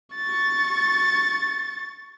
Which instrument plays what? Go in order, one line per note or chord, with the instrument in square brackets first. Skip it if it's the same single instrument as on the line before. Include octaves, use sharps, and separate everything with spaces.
[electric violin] C#6 A6